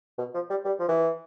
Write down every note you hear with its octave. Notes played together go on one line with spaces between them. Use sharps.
B2
F3
G3
G3
F3
E3